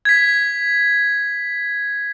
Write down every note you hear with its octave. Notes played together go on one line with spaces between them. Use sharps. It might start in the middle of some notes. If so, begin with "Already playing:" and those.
G#6 B6